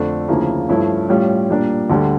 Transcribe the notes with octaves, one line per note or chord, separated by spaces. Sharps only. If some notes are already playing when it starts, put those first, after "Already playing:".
Already playing: F2 D3 A3 D4
D2 C#3 F3 A#3 E4
G2 F3 A3 C#4 E4
A2 G3 C#4 F4
A#2 G3 A#3 D4
D2 D3 G3